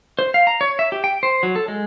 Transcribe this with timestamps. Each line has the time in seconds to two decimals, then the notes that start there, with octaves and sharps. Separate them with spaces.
0.19 C5
0.34 F5
0.47 A#5
0.61 C#5
0.79 E5
0.92 G4
1.04 G5
1.23 C5
1.43 F#3
1.56 A4
1.68 G#3